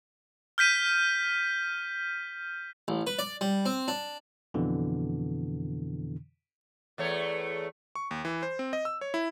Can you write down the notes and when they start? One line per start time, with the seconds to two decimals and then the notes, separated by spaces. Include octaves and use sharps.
0.58 F6 G6 B6 D#7
2.88 A1
3.07 B4
3.19 D5
3.41 G3
3.66 C4
3.88 D4
4.54 F2 B2 D3 E3
6.98 E2 A3 C#5
7.95 C#6
8.11 D#2
8.25 E3
8.43 C5
8.59 C4
8.73 D#5
8.85 E6
9.01 C#5
9.14 E4